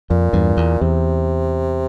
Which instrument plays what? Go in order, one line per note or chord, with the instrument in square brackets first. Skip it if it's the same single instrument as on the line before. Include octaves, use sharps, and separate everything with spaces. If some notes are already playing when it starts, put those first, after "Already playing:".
[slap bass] F2 [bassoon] A#2
[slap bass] E2 G2
E2
[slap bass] E2 [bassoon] C3